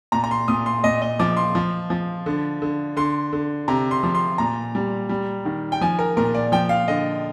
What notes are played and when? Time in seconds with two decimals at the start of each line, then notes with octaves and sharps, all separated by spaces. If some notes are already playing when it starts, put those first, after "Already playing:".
0.12 A#2 A#5
0.24 A#5
0.31 C6
0.48 A#2 D#6
0.66 C6
0.84 A#2 D#5
1.02 D#5
1.19 F3 D6
1.37 C6
1.55 F3
1.90 F3
2.26 D3
2.62 D3
2.97 D3 C6
3.33 D3
3.68 C3 A#5
3.91 C6
4.03 F3
4.15 C6
4.38 A#2 A#5
4.75 G3
5.09 G3
5.45 D#3
5.72 G5
5.81 F3 G#5
5.99 A#4
6.17 A#2 A#4
6.35 D5
6.52 F3 G5
6.69 F5
6.88 D3 D#5